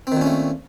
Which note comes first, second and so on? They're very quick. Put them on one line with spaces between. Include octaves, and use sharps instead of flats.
C4 D#3 A#2 C#4 A3